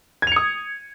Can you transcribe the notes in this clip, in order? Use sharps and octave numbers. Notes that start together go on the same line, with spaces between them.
D#6 G#6 C#7 F7